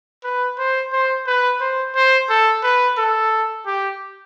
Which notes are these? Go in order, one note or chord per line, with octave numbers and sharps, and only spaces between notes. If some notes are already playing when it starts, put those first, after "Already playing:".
B4
C5
C5
B4
C5
C5
A4
B4
A4
G4